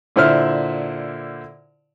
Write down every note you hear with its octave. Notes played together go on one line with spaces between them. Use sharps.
A#2 D3 E4 C5 E5 F6